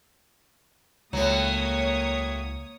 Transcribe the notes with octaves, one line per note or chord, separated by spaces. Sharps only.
C#2 A2 F#3 A#3 C#5 D#6